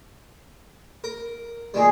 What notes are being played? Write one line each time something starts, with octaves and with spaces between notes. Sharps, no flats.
A#4
A#2 D#3 G3 G#4